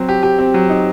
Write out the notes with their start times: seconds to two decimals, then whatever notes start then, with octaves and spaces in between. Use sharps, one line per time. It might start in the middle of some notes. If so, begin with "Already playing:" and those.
Already playing: F#3 C4
0.08 G4
0.23 G4
0.39 C4
0.54 F#3
0.70 D#4